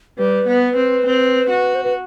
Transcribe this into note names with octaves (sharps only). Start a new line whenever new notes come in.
G3 B4
B3
C4
C4
F#4
C5
B4